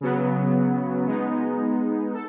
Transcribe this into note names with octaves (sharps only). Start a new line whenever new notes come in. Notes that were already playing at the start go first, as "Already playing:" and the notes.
C#3 F#3 B3
G#3 B3 D#4
A4